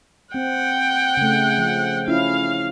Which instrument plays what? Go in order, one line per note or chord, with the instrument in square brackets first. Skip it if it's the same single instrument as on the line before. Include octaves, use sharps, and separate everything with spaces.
[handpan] C4 [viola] F#5 G5
[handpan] C#3 A3
F3
[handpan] C#4 E4 F4 [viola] F5